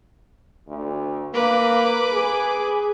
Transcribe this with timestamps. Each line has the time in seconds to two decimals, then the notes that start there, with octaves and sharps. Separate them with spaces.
0.68 D2
1.34 A#3 B4 D6
2.13 G#4